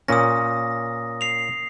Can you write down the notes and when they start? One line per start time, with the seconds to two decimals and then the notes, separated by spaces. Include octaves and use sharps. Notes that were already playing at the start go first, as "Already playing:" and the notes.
0.08 A#2 C#4 D#6 A#6
1.21 C7 F7